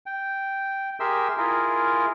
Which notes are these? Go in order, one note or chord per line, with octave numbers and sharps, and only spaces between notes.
G5
G4 G#4 A#4 E5 C6 E6
E4 F4 G#4 A#4